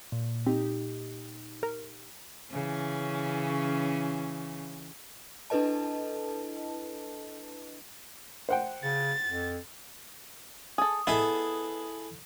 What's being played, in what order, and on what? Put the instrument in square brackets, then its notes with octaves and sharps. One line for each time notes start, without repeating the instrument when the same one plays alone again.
[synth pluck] A#2
[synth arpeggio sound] C4 [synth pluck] D#4 G4
[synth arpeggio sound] A#4
[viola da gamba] C#3 E3 C#4
[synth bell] D4 E4 A4 B4 D#5 A5
[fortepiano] C5 F#5 G5
[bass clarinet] C#3 [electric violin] A6
[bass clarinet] F2
[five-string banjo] G#4 A4 [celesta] D#6
[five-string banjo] B3 D#5 E5 [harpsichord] E4 G#4 A4